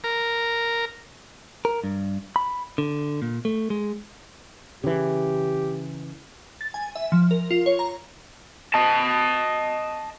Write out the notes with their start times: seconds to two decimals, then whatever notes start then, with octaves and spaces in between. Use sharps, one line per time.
0.04 A#4
1.65 A#4
1.84 G2
2.36 B5
2.78 D3
3.22 A#2
3.45 A3
3.70 G#3
4.84 C#3 E3 G4
6.61 A6
6.74 G#5
6.96 E5
7.12 F3
7.31 A#4
7.51 F4
7.66 C#5
7.79 A#5
8.74 D#5 A5